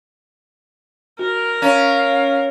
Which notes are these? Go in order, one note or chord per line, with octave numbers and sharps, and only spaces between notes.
F#4 A#4
C#4 F5 A#5